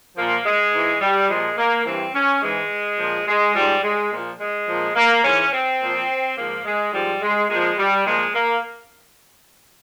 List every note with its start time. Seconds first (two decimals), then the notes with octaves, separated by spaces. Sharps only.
0.16 A#2 F3 A#3
0.45 G#3
0.73 G#2 E3
1.01 G3
1.29 A#2 F3 G#3
1.58 A#3
1.85 G2 E3 C4
2.14 C#4
2.42 G#2 E3 G#3
2.98 A#2 F3
3.27 G#3
3.55 G#2 F3 G3
3.83 G#3
4.11 A#2 F3
4.39 G#3
4.67 A#2 F3
4.96 A#3
5.24 G#2 E3 C#4
5.52 C4
5.80 A#2 F3
6.37 G#2 F3 A#3
6.65 G#3
6.93 G#2 F3 G3
7.22 G#3
7.49 A#2 F3 G#3
7.78 G3
8.05 A#2 F3 G#3
8.34 A#3